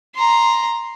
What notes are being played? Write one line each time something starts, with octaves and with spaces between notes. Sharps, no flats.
A#5 C6